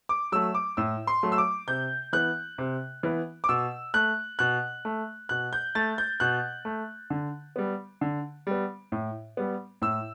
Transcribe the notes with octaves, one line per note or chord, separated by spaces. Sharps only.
D6
F#3 A3 E6
D6
A2 E6
C6
F#3 A3
E6
D6
C3 G6
E3 B3 F#6
C3
E3 B3
D6
B2 E6
A3 F#6
B2 F#6
A3
B2 F#6
G6
A3 A6
G6
B2 F#6
A3
D3
G3 B3
D3
G3 B3
A2
G3 B3
A2 E6